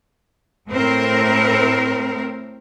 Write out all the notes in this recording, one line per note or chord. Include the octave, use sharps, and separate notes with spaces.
A2 C4 A#4